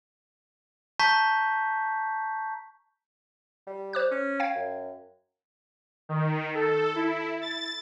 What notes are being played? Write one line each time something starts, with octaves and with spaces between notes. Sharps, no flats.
A5 A#5 C#6 G6 B6
G3
C5 D6 F#6
C#4
F5 G5 G#6
F#2
D#3
A4
E4
A6